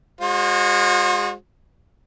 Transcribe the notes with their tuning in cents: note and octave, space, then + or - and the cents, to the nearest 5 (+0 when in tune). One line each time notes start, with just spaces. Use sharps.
G#3 -25 F#4 -40 C5 +25